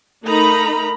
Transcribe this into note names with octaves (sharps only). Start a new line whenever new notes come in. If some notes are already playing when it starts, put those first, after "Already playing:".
A3 D#4 A#4 A#5 B5